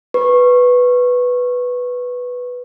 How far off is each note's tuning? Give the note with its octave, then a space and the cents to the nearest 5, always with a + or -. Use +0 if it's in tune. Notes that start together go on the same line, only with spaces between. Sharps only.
B4 +0 C#6 -20